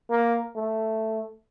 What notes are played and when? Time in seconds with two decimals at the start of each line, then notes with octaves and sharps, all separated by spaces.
0.11 A#3
0.56 A3